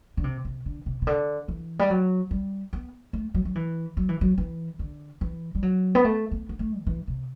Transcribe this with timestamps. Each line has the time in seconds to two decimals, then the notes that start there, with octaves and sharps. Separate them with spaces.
0.17 D3
0.24 C3
0.45 C3
0.66 D3
0.86 C3
1.02 C3
1.07 D3
1.48 E3
1.79 G3
1.90 F#3
2.31 G3
2.73 B3
3.13 A3
3.34 F#3
3.45 F#3
3.55 E3
3.97 F#3
4.09 E3
4.21 F#3
4.38 E3
4.79 D3
5.21 E3
5.55 G3
5.63 F#3
5.95 B3
6.04 A3
6.32 B3
6.49 B3
6.59 A3
6.82 D3
6.87 E3
7.07 C3